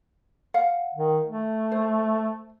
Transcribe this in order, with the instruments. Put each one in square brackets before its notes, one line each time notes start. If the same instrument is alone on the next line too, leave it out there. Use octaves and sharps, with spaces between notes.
[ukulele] F5 F#5
[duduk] D#3
A3
[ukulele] C5